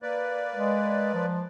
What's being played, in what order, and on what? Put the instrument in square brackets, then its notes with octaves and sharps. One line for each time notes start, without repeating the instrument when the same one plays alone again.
[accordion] A#3 B4 D5
[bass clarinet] G#3
F3